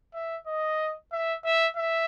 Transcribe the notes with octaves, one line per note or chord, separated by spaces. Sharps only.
E5
D#5
E5
E5
E5